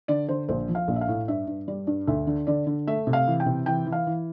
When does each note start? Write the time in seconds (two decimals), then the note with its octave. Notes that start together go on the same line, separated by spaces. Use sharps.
0.08 D3 D5
0.29 D3 C5
0.48 A#1 C5
0.69 F3
0.75 F5
0.88 A#1
0.96 E5
1.01 F5
1.08 A2
1.28 G2 E5
1.47 G2
1.68 G3 D5
1.87 G2
2.07 D2 E5
2.27 D3
2.47 D3 D5
2.67 D3
2.87 A3 E5
3.07 C3
3.13 F5
3.27 E3
3.40 G5
3.46 C3
3.66 E3 G5
3.87 E3
3.92 F5
4.07 E3